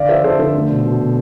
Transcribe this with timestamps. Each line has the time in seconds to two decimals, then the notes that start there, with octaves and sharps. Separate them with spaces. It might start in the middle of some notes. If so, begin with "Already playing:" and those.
Already playing: D3 D5 F5
0.09 F3 C5 E5
0.24 D3 A4 C5
0.39 D3
0.54 A3
0.69 B2
0.84 B2
1.00 B2